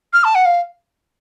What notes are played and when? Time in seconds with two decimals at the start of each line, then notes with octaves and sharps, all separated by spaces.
0.13 F6
0.24 A5
0.35 F#5
0.45 F5